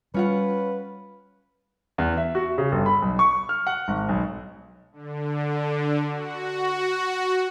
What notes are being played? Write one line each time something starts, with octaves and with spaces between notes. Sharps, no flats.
G3 C#4 F4 B4 F#5
E2
E5
F#4
C#3
G1
B5
B1
C#6
F6
F#5
G#1
B1
D3
F#4